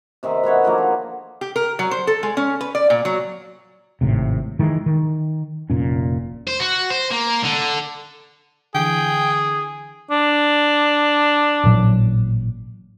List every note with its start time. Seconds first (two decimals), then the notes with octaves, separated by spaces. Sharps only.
0.23 C3 D#3 G#4 E5
0.43 B2 B3 C#5 F#5
0.63 D3 F3 F#3 A#3
0.78 D#4
1.41 G4
1.56 A#4
1.79 F#3
1.91 C5
2.07 A4
2.23 G#3
2.37 C#4
2.61 B4
2.75 D5
2.90 A#2
3.05 F#3
4.01 G#1 A2 C3
4.59 D#3 E3 G#3
4.86 D#3
5.70 F1 A#2 C#4
6.48 C5
6.60 F#4
6.90 C5
7.11 A#3
7.44 D3
8.75 D3 E3 G#4 G5
10.11 D4
11.64 A1 A#2 F#3